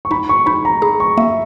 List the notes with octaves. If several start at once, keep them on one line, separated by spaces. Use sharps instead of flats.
C#6
D#4 B5
C#6
D#4 B5
A#5
G#4 B5
C#6
A#3 E5